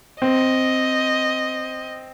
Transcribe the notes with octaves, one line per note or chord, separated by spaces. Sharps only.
C4 D#5